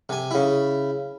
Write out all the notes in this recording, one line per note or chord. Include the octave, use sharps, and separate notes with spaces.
C3 G#5
C#3 E4